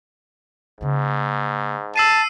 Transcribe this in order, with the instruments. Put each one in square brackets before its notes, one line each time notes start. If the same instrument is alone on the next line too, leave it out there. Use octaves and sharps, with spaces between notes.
[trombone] G#2 [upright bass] C#3 A#3
[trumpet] A5 [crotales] E6 C7 D#7